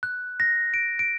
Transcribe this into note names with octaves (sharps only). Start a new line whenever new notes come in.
F#6
A#6
D7
D7